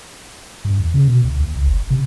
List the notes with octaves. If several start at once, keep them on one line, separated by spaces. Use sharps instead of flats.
G2
E2
C#3
B2
D2
D#2
C#2
F#1
C3